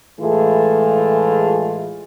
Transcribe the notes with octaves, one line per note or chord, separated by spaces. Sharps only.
A2 E3 G#3 A3 F4 G#4